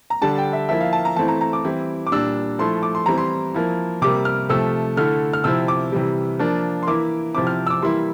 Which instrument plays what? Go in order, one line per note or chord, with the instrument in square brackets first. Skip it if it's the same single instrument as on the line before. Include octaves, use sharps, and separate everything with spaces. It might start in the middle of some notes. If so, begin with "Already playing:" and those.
[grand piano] A#5
D3 G3 D4 A5
G5
E5
F3 A#3 E4 E5
F5
A5
A#5
E3 A3 C4 E4 A5
A#5
A#5
D6
E3 G3 C4 E4
D6
A#2 G3 D4 E6
F3 A3 E4 C6
D6
C6
E3 G3 C4 E4 A#5
C6
F3 A#3 E4
C3 G3 A#3 D6
F6
C3 F3 A3 E6
D3 A3 E4 F6
F6
C3 F3 C4 E4 E6
D6
C3 E3 G3
F3 A#3 D4
C6
E3 A#3 E4 D6
C3 F3 C4 E4 D6
F6
E6
D6
E3 G3 A#3 E4 C6